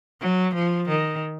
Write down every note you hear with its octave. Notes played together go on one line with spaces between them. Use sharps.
F#3
F3
D#3